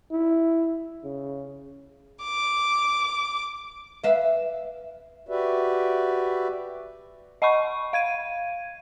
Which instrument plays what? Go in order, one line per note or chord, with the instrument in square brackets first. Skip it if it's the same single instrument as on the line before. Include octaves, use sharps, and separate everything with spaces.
[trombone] E4
C#3
[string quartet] D6
[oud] B4 E5 F5
[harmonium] F#4 G4 B4 D5 E5
[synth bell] D#5 F#5 B5 C#6
F5 G#6 D#7